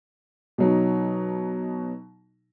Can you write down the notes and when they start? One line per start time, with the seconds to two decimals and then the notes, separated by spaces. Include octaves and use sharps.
0.58 B2 F#3 D#4